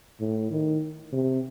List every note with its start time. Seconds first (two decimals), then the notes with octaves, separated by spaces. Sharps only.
0.20 A2
0.51 D#3
1.13 C3